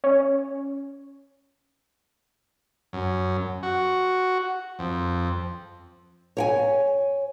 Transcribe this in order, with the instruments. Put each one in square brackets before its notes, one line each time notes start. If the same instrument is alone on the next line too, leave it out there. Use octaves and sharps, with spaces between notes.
[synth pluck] C#4
[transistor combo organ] F#2
F#4
F2
[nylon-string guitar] C#5 G5 G#5